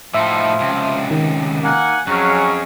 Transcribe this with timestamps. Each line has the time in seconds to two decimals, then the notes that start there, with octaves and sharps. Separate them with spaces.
0.14 A2 F3 D#4 E5
0.60 C#2 C3
1.11 D#3
1.63 A#3 F#5 G#5
2.07 F2 F#3 C#4 G#4 F6 F#6